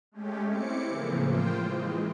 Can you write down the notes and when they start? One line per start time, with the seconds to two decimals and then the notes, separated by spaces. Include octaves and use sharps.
0.12 G#3 A3 C#4 G4
0.46 C4 E4 D6 C#7
0.85 A2 C#3 E3 F3 A#3
1.23 F4 C5 G5
1.59 E3 G#3